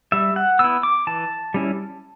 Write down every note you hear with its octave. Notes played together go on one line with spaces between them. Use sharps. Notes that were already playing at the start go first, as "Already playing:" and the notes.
G3 E5
F#5
B3 E4 E6
D6
E3 A5
G3 C#4 E4